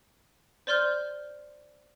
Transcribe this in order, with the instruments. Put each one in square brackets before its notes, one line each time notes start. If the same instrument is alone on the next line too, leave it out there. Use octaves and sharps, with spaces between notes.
[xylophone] C5 D5 C6 F6 G6